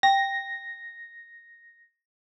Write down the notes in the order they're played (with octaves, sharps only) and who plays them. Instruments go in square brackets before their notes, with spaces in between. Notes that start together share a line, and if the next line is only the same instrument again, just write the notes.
[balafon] G5 [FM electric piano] A#6